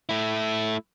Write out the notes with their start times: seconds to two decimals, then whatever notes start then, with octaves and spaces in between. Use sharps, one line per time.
0.09 A3 E4